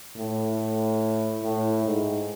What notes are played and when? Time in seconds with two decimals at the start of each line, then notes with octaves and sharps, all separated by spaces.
0.16 A2
1.43 A2
1.86 G#2